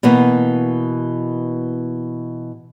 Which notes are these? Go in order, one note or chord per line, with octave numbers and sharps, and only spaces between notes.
B2 E3 A#3 B3